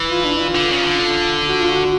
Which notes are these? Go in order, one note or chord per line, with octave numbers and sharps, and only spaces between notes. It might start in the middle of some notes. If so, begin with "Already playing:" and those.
Already playing: E3
F4
D4
F4
D3
C#3
D#3
D3
F#4
F4
F#4